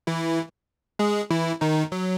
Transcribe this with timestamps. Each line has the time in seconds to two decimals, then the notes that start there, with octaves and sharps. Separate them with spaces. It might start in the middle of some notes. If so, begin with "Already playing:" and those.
0.07 E3 E4
0.99 G#3 G#4
1.31 E3 E4
1.61 D#3 D#4
1.92 F#3